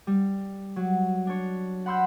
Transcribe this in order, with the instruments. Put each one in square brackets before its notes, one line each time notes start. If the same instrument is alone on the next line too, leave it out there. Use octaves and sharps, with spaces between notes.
[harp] G3
F#3
D4 C#5
F#5 B5 C6 E6 F#6 G6